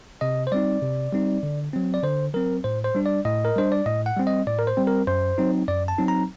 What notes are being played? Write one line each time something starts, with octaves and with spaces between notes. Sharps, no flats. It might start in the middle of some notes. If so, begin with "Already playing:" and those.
C3 D#5
C5
G3 C4 D#4 D5
C3
G3 C4 D#4
D3
F#3 C4
D5
D3 C5
F#3 C4 A#4
A2 C5
C5
G3 D4
D5
A2 D#5
A#4
G3 D4 C5
D5
A2 D#5
F#5
G3 C4
D#5
A2 D5
A#4
C5
G3 C4
A#4
F#2 C5
F#3 C4 D#4
F#2 D5
A5
F#3 C4 D#4
A#5